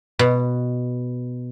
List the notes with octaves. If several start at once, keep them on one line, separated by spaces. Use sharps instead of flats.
B2